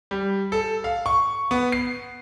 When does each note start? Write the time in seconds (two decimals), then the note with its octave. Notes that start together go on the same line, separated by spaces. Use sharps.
0.11 G3
0.52 A4
0.84 F5
1.06 C#6
1.51 B3
1.72 C7